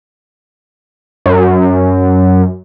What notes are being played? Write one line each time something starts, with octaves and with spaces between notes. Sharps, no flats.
F#2